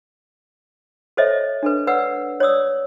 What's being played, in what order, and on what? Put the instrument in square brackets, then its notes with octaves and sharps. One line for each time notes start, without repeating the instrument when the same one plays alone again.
[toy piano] A4 C5 C#5 D#5 E5
D4 A4 B4
B4 C#5 D5 F#5 E6
C#5 D5 D#6 E6